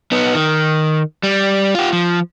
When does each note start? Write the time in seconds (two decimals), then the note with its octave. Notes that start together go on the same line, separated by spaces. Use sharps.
0.12 B3 D#4
0.35 D#3
1.23 G3
1.75 F4 G4
1.93 F3